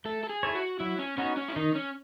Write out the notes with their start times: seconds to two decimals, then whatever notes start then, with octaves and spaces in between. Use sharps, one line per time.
0.05 A3 A4
0.23 A4
0.29 G#4
0.43 E4 A4 C#5
0.55 F#4
0.80 F#3 E4
0.99 C#4
1.17 B3 C#4 D#4 F#4
1.37 C#4
1.48 E4
1.56 D#3 D#4
1.75 C#4